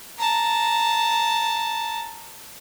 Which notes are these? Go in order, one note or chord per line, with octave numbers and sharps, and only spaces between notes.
A5 A#5